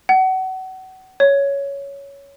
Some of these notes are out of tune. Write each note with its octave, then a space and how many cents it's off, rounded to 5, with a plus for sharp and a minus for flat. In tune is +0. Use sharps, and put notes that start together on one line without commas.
F#5 +30
C#5 +10